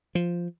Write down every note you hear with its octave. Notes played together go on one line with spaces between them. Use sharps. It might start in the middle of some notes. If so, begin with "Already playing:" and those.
F3